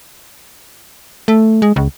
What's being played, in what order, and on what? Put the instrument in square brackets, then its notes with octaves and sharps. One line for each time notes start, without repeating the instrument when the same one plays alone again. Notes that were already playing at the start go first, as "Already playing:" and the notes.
[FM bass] A3
G#3
C#2